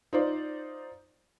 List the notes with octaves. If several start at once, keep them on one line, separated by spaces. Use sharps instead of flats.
D#4 F4 C5 D5